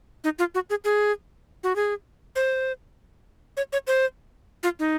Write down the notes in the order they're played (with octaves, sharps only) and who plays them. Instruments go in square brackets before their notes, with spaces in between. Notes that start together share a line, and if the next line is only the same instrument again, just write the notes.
[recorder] D#4
F4
F#4
G#4
G#4
F#4
G#4
C5
C#5
C#5
C5
F4
D#4